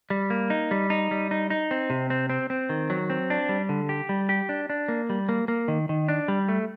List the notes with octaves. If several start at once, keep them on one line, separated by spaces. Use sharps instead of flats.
G3
A#3
D#4
G3
D#4
G3
D#4
D#4
C4
C3
C4
C4
C4
D#3
F#3
C4
D4
G3
D3
G4
G3
G4
D4
D4
A#3
G3
A#3
A#3
D#3
D#3
D4
G3
A3